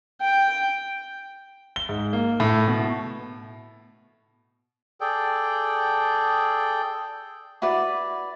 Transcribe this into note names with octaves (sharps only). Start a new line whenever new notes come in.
G5
G7
G#2
A#3
A2
B2
G#4 A4 D5 G5
E4 F#4 B4 D5